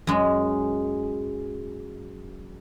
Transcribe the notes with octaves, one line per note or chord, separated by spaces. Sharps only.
F#2 G#3